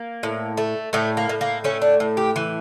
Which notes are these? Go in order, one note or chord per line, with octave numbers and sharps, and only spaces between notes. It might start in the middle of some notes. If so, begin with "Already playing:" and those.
Already playing: A#3
A2
A3
A2 A3
A#3
A2
A#3
A3 C#4
D4
A2
G4
E3